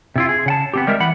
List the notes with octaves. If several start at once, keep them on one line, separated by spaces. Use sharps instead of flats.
C3 E4 F4
G#4
C#3 F#5 A5
B3 C4 G4
G3 G#3 A#4 E5
E3 F#5 B5